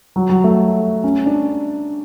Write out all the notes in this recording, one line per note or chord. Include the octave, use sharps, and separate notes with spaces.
F#3
F#3
A3
C#4
D4